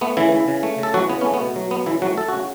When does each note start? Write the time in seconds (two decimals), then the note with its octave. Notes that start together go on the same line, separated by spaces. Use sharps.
0.01 A3 B3
0.17 C#3 E3 E4
0.32 E3
0.48 C#3
0.63 A3
0.79 C#3 A4
0.94 E3 F#3 F#4
1.09 C#3 B3
1.21 A3 C#4
1.34 B3
1.40 B2
1.56 F#3
1.71 B2 B3
1.86 C#3 E3 E4
2.02 F#3 A3 F#4
2.18 A3 A4
2.28 C#3 F#4